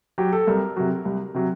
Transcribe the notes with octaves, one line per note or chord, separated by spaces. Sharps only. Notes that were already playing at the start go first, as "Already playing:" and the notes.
F#3 G4
A4
C2 A#4
C3 F#3
C2
C3 F#3